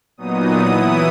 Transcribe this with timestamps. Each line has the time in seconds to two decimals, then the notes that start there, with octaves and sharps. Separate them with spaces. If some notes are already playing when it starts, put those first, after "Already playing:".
0.17 A#2 F#3 B3 D#4 D#6
0.59 E3 B3 E4